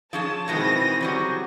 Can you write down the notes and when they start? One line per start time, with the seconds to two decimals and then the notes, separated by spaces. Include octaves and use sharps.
0.13 F3 C#4 G#4 A5
0.48 B2 D#3 E3 G#3 C4 D#6 A#6
1.01 C#3 F#3 G3